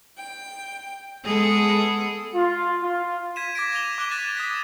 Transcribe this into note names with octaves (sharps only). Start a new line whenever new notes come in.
G5
G#3 B3 G#4 A4
F4
F4
G#6 B6 D#7 E7
D6 G#6 A#6 B6 D7
A#6 D7 D#7 F7 G7
D6 F#6 A#6 D7 G7
F#6 A6 B6 D#7 E7
D#6 G#6 B6 E7